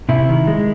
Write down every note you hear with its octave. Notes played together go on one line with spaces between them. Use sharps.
C3 E4
D#3
G#3